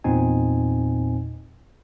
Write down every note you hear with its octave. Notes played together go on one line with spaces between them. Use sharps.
E2 A#2 C4 D#4 G#5